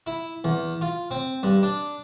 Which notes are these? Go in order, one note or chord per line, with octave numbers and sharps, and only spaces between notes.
E4
E2
F4
C4
G2
D4